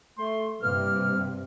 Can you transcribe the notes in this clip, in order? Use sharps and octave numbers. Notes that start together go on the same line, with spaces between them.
A3 C6
G2 C3 E3 A#3 F6